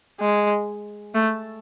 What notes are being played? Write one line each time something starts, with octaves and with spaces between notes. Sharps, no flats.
G#3
A3